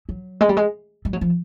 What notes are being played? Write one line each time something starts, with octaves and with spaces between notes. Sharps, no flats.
F#3
G#3
G3
G#3
G3
F#3
F3